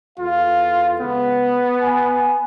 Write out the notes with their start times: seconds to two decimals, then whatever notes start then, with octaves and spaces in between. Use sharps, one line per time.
0.19 E2 F4 A4 F5
1.00 C#2 B3
1.82 G#5